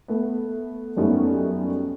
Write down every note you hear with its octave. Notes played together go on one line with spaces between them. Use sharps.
A3 B3
F#2 G3 A3 B3 C#4 D#4